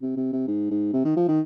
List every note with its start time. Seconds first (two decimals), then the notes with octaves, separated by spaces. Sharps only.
0.02 C3
0.17 C3
0.32 C3
0.47 G#2
0.71 G#2
0.93 C3
1.05 D#3
1.17 F3
1.28 D#3